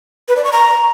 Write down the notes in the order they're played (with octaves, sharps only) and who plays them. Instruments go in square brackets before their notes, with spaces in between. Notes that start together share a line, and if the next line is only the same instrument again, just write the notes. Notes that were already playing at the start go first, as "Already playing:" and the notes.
[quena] B4
D5
C#6
A#5